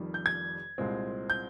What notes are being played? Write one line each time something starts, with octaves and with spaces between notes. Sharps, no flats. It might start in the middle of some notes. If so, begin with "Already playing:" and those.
Already playing: F1 F2 D#3 G3
G6
G#6
C2 A#2 G#3 C4
G6